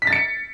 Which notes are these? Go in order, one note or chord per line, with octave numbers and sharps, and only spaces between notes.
B6
A6
C#7